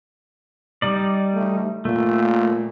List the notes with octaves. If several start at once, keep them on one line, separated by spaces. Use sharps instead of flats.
G3 D#4 D5
A3
A#2 A3